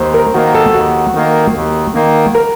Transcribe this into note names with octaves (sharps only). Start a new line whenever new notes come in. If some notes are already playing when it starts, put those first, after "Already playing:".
Already playing: D#2 C5
A#4
D#3 A#3 F#4
A4
D#2 F#4
D#3 A#3
D#2
D#3 A#3
A#4